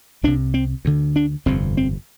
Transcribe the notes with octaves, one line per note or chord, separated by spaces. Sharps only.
C2 C3 D4
C4
D2 D3
D4
G1 F2 C3 C4
C4